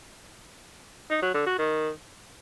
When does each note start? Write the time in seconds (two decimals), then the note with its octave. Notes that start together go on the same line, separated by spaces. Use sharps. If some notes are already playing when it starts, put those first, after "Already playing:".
1.11 D#4
1.22 F#3
1.34 D3
1.46 F#4
1.58 D#3